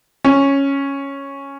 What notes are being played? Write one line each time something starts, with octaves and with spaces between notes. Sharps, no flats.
C#4